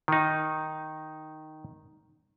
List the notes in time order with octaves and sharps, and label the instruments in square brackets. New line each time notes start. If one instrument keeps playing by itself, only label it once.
[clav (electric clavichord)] D#3 D#4